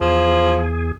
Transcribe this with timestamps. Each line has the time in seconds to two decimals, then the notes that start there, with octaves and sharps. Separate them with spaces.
0.01 E2 F3 G#4